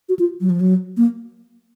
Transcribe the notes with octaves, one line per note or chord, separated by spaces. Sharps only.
F#4
F4
F#3
F3
F#3
A#3